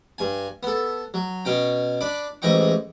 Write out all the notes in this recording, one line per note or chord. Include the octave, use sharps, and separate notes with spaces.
G2 G#5
B3 A4
F#3
B2 C#4 G5
D4 B5 D6
A1 G#2 E3 D#5 G5 C#6